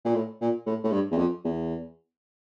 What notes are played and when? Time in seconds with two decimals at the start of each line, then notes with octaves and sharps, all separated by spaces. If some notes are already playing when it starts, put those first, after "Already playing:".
0.05 A#2
0.15 A2
0.41 A#2
0.66 A2
0.84 A2
0.92 G2
1.11 E2
1.18 F2
1.44 E2